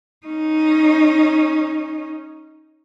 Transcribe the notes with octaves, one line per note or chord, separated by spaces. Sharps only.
C#4 D#4